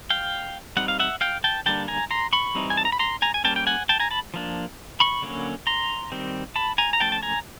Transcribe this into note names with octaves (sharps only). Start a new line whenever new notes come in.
F5 G5
G3 C4 D#4 F#5
F5
E5 F#5
F5 G5
G5 A5
D3 G3 A#3 D4 G5 A5
G#5 A#5
A#5 C6
B5 C#6
E3 G3 C4 D#4
G#5
A5
A#5
B5
A#5 C6
G#5 A#5
G#5
G3 A#3 C#4 G5 A5
G5
F#5 G#5
G5 A5
G#5 A#5
A5 B5
F3 A#3 D4
B5 C#6
D3 F#3 A#3 C#4
A#5 C6
D#3 G3 C4
A5 B5
G#5 A#5
A#5
F3 A3 C#4 G5 A5
A5
G#5 A#5